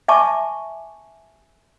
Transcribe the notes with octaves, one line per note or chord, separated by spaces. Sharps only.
E5 G#5 A5 C#6 D6